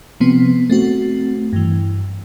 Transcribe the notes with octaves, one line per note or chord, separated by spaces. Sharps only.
C3 F3 B3 C4
A3 C4 F#4
G2 E3